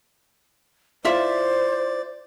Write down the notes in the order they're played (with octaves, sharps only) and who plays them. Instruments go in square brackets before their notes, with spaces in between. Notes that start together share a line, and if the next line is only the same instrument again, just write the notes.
[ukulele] E4 F4 E5 [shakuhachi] C5 [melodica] D5